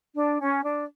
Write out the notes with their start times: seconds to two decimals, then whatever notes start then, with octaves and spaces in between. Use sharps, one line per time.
0.16 D4
0.41 C#4
0.64 D4